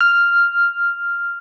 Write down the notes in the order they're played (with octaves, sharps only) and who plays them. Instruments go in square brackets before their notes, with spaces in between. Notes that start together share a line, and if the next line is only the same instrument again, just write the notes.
[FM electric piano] F6